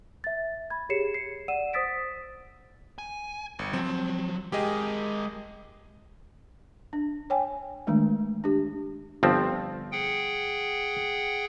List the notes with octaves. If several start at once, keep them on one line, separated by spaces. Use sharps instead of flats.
E5 A6
B5 G#6
G4 G#4 C#5 C7 C#7 E7
C7
D5 F#5 E6 D#7 E7
C5 D#6 E6 A6 B6 D7
G#5
G1 C#7
F3 F#3 C4
G#3 G4 G#4 A#4 D#5
D4
C#5 G5 G#5
D#3 E3 G#3 A3 D4
D4 G4
G1 F3 C4
G#4 F#5 G5